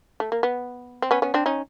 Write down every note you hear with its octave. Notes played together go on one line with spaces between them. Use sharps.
A3
A#3
B3
C4
B3 C#4
B3 C#4
C4 D4
C#4 D#4